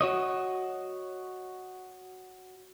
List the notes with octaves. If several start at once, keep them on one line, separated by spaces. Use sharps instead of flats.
F#4 C#5 D#5